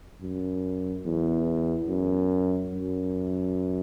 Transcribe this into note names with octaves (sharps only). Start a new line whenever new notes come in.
F#2
E2
F#2
F#2